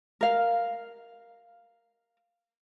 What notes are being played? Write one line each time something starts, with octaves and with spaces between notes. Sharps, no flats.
A#4 F5